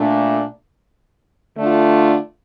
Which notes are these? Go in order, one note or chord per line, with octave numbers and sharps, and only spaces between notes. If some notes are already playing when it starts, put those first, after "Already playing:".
Already playing: A#2 A3 D4
D3 A3 D4 F4